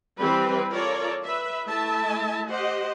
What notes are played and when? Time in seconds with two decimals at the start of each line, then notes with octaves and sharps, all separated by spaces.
0.21 E3 G3 C4 B4
0.71 F4 A4 A#4 C#5 D5
1.25 B4 E5
1.67 A3 E4 E5 A5
2.49 G4 C5 D#5 F#5